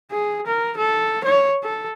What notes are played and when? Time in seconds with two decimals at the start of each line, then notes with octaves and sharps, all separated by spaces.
0.11 G#4
0.47 A#4
0.78 A4
1.25 C#5
1.63 A4